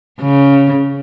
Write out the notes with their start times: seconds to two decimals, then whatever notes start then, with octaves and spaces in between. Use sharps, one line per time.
0.21 C#3